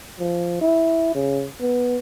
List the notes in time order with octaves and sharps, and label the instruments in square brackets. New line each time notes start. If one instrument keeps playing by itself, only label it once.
[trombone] F3
E4
C#3
B3